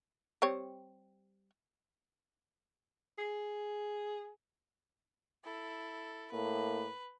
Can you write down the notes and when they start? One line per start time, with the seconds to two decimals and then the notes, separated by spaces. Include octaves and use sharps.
0.42 G3 C4 C#5
3.18 G#4
5.44 E4 A4
6.32 A2 A#3 B4